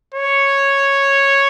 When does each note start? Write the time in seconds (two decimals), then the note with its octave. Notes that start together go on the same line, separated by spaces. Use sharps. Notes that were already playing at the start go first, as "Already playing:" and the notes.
0.14 C#5